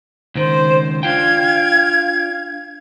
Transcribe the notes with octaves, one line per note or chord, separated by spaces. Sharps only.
C#2 D#3 C5
D4 F4 F5 G5 G#6